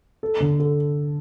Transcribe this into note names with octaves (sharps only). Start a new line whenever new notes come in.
A4
D3
A4